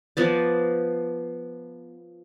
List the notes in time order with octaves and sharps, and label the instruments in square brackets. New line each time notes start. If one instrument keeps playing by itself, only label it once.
[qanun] F3 B3 D5